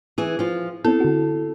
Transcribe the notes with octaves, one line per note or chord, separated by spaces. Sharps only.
E3 G#4
F3 F4
B3 C4 E4 A4
D3 F#4